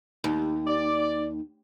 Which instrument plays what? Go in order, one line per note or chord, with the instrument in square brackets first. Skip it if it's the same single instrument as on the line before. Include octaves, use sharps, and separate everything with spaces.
[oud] D#2
[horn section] D5